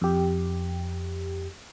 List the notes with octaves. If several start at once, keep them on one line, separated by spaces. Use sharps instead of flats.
F2 G4